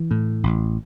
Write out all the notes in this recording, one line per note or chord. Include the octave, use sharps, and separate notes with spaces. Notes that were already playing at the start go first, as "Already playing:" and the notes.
Already playing: E3
A2
A1